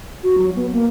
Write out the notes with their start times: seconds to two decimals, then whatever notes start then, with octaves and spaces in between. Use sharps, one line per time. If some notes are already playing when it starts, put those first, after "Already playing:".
0.24 F#4
0.38 F#3
0.56 B3
0.72 A#3